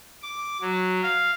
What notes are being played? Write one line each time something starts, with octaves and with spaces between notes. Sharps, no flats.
D6
F#3
F5